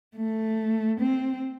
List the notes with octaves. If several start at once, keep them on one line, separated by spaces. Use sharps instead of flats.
A3
C4